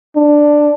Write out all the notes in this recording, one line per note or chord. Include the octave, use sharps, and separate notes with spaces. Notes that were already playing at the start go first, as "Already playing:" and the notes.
D4